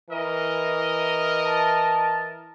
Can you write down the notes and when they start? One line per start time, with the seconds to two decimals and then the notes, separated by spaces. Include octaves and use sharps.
0.10 E3 A#4 D#5
1.46 A5